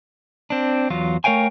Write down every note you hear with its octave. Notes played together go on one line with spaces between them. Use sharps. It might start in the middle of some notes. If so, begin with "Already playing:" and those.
C4 D4
E2 F#3 F4
A3 A#4 C#5 F5 G5 G#5